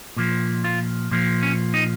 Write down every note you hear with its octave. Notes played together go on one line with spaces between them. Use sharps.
A#2 F3
F4
A#2 F3
C#4
D#4